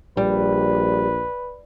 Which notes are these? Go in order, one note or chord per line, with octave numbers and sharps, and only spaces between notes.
A#1 G3 B4